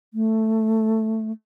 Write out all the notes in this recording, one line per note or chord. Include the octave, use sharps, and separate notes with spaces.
A3